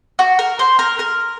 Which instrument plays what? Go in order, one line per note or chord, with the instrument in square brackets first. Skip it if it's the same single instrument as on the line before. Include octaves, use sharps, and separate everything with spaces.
[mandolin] F#4
A#4
C5
A#4
A#4